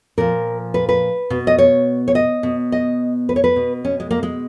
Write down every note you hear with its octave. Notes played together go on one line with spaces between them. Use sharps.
A#2 F3 A#4
B4
B4
B2
D#5
C#5
C#5
D#5
B2
D#5
B4
C#5
B4
B2
C#4
G#3
A#3
G#3